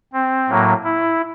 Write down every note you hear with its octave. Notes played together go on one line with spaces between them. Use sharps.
C4
A2 F#3 A#3
E4